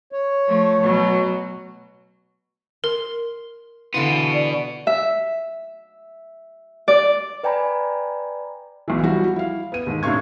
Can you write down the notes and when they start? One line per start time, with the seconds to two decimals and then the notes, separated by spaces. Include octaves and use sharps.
0.12 C#5
0.47 F3 A3
0.80 B2 F#3
2.84 A#4 C6
3.94 B2 D3 E3 B3 F5 C6
4.33 D5
4.87 E5
6.88 D5
7.43 B4 D5 G5 G#5 A#5 B5
8.88 B1 E3
9.03 F3 G3 E4 F#4
9.36 E4 F5
9.72 B3 D#7
9.86 D#2 G#2
10.03 A2 C3 D4 F5 C#6 G#6